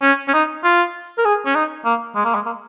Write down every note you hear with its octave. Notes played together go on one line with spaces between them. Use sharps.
C#4
C#4
D#4
F4
A#4
G#4
C#4
D#4
A#3
G#3
A#3
G#3
A#3